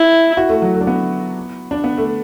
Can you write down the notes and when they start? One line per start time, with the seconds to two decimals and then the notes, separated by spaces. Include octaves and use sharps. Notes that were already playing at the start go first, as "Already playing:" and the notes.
Already playing: E4
0.37 F#4
0.49 A3
0.62 F#3
0.74 A3
0.81 D4
0.87 B3
1.71 D4
1.84 B3
1.98 A3